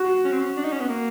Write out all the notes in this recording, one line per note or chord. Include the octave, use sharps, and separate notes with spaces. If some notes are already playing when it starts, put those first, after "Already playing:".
Already playing: F#4
C#4
C4
C#4
D4
D#4
C#4
B3
A#3